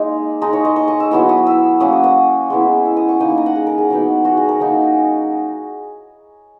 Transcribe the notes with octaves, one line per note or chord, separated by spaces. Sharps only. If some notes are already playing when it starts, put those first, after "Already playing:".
Already playing: G#3 A#3 D#4 G#5
G#3 D#4 A#5
C#5
D#5
C#6
D#6
E6
F#3 B3 E4 D#6
D#6
E6
F#3 A#3 C#4 D#6
D#6
D#6
G#3 B3 E4
E6
D#6
C#6
A#3 D#4 D#6
C#6
A#5
F#5
G#4
A#4
G#4
F#3 B3 D#4
F#4
G#4
A#4
F#3 A#3 D#4